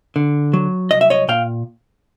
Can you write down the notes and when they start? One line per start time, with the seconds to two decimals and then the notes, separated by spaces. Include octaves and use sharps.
0.16 D3
0.53 F#3
0.91 C2 D#5
1.01 E5
1.10 C#5 D#5
1.28 A#2 F5 G5